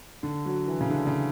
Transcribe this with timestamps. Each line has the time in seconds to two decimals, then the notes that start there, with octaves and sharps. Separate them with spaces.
0.23 D3
0.45 F#3
0.68 E3
0.81 C#3
0.90 D3
1.07 C#3